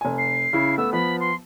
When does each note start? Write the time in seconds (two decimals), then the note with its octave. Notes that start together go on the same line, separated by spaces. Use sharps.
0.01 F1 G#5
0.18 C7
0.53 C#3 E4
0.78 A3 B3 E6
0.93 F3 B3 B5
1.20 C6